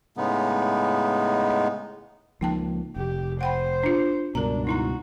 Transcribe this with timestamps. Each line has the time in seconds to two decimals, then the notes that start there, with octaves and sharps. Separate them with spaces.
0.17 A2 C#3 G#3 B3 D#4
2.41 C#2 F3 A#3 D#4 G5 A5
2.96 F1 G4
3.41 C5 F#5 G5 B5
3.83 D4 F4
4.35 C#2 G2 B2 D4 A#4 A#5
4.67 D#4 E4 F#4 A#5